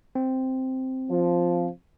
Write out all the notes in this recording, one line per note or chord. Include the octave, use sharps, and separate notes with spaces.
C4
F3